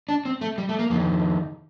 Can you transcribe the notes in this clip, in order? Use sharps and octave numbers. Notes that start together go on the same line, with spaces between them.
D4
C4
A3
G3
A3
A#3
F2 D#3 A#3